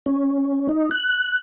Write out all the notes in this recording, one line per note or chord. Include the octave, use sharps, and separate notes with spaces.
C#4
D#4
F#6